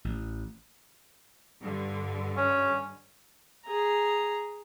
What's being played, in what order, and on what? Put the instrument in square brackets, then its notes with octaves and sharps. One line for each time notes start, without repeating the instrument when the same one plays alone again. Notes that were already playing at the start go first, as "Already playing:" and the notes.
[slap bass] A1
[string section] G2 D3
[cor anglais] C#4
[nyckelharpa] G#4 A#5